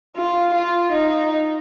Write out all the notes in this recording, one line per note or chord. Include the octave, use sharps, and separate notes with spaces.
F4
F4
D#4